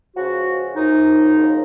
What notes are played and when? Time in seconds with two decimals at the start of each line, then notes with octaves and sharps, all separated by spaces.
0.15 C#2 C#3 F3 F#4
0.75 F#2 F3 D#4
1.33 D#2 C#3 F3